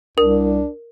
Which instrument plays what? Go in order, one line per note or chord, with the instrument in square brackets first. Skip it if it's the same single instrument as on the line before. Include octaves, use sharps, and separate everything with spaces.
[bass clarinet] C2 [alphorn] D4 [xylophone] A#4